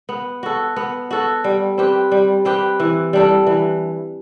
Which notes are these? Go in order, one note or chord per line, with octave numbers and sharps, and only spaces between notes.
B3
F#4 A4
B3
F#4 A4
G3
C4 G4 B4
G3
C4 G4 B4
E3
G3 D4 A4
E3